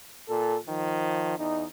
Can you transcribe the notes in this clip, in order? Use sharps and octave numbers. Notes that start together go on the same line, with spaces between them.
A#2 A4
D#3 F3
E2 D#4